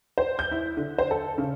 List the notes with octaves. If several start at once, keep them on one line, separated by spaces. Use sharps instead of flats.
C5
G6
E4
D3
C5
A4
C#3